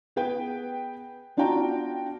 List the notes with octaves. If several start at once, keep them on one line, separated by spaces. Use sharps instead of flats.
B3 G#4 B4 G5
B3 D4 F4 F#4 G5 A#5